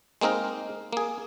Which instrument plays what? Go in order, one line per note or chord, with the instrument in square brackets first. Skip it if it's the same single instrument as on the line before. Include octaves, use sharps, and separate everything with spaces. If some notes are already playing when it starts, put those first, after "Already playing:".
[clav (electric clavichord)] G#3 A#3 C4 D#4 A#4
A#3 G#4